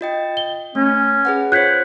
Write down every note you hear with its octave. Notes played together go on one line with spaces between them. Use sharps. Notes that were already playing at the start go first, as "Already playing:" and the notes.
F4 D#5 G5
G7
A3 C#4
G#4 B4 F#5
F4 C5 C#5 F#6 G6 B6